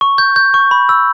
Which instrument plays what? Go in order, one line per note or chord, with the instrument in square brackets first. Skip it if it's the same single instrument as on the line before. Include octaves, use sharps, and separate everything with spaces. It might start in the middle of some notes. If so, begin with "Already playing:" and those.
[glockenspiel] C#6
G6
G6
C#6
B5
E6